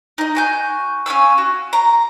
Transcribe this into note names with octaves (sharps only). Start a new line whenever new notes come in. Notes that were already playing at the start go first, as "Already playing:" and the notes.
D#4 D#5
F#4 G#5 G6
C#4 F5 G#5 E6
F#4
A#5